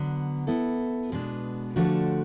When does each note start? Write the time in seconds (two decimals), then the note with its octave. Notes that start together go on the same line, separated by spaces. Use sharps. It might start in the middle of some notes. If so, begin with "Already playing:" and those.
Already playing: D3 F#3 B3
0.47 B3 E4 A4
1.12 B2 G#3 B3 D4
1.76 D3 F3 A3 D4 F#4